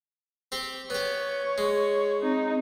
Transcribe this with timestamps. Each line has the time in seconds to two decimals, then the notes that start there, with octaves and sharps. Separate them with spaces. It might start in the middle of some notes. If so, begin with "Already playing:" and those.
0.52 C4 G4
0.90 B3 G4 C#5
1.58 G#3
2.22 C4 D#4